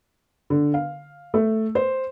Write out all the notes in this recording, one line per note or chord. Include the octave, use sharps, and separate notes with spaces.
D3
F5
A3
C5